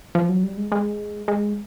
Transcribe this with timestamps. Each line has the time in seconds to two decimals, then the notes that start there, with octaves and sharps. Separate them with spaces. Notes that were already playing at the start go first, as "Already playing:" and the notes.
0.15 F3
0.29 F#3
0.43 G3
0.57 G#3
0.72 G#3
1.28 G#3